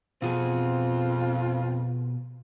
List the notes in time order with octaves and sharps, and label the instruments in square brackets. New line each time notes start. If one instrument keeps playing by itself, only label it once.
[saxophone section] F2 C4 F4 [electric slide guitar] B2 G#4